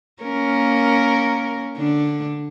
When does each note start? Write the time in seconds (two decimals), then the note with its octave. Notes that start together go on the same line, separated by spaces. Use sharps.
0.23 A#3 C#4 A#4
1.77 D3 D4